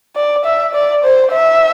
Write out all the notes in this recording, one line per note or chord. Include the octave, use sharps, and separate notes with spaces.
D5
E5
D5
C5
E5